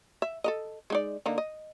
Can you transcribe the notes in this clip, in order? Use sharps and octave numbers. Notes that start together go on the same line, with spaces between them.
E5
A4 A#4 D#5
G#3 D#4 D5
D3 A#3 D#4
D#5